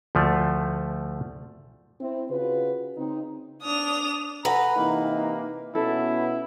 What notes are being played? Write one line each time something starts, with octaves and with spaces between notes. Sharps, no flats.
D2 F3 A3
C4 E4
C#3 F4 F#4 B4
C#3 C4 D#4
D4 D#6 F7
A4 B4 F#5 G#5 A#5
C3 E3 A#3 D#4
B2 B3 C#4 E4 A4